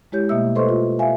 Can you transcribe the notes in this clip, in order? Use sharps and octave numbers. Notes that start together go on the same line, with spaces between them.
G#3 E4 G4 C#5 G6
B2 A3 A#3 D#5 E5 E6
A4 B4 C5 D#5 C6 C#6
F4
E5 F5 G#5